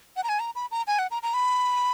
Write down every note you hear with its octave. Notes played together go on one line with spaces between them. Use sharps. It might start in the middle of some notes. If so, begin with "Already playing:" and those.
F#5
A#5
G#5
A#5
B5
A#5
G#5
F#5
A#5
A#5
B5